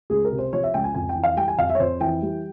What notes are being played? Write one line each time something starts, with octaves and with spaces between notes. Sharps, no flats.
C#2 G#4
A#4
C3
C5
F3 C#5
E5
C#2 G5
G#5
F2 G#5
G5
E3
F5
G3 G5
G#5
F2 F5
E5
C#5
F2 C5
E3 G5
G3